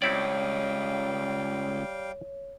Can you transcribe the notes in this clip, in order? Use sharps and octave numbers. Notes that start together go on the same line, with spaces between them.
C#2 G3 C4 E4 C#5 D5 F5 G5